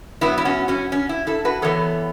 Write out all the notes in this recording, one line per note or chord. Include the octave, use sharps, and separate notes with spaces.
F#2 F#3 B3 E4
E4
C#4 F#4
C#4 F#4
C#4
E4
E4 A4
F#4 B4
E2 E3 B3 A4 C#5